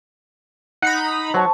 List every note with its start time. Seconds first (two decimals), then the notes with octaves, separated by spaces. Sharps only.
0.82 D#4 F#5 A#5 B5
1.34 F#3 C5 A5 C#6